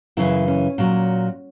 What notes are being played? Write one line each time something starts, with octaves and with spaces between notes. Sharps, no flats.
F#2 C#3 E3 E4
C#4
A#2 F#3